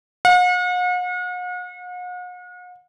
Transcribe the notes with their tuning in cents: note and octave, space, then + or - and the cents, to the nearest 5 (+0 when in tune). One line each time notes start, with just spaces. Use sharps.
F#5 -45